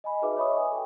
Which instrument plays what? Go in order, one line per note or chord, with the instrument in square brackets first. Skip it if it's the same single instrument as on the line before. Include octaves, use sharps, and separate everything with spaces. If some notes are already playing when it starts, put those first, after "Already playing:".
[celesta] D#5 G#5 B5
D#4 F#4 G#4 B4 E5 D6
C#5 D#5 E5 B5 C#6 D#6
G#5
A4 G5